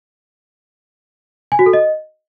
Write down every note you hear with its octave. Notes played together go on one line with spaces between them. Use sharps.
G#5
F#4
A4
D#5